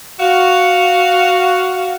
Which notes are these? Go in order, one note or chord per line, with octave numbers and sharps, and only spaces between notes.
F#4 F5